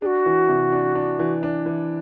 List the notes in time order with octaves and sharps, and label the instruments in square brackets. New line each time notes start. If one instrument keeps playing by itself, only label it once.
[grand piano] D4 [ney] F#4 G#4
[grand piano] E3
C3
D4
D4
E3
D4
E3